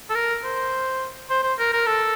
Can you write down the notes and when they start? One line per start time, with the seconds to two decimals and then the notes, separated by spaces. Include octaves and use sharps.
0.10 A4
0.15 A#4
0.43 C5
1.30 C5
1.43 C5
1.59 A#4
1.73 A#4
1.86 A4